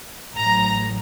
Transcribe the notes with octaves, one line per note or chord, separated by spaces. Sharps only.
A1 A2 F#3 A#5